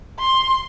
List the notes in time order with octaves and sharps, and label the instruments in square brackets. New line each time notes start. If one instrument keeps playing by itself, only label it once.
[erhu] C6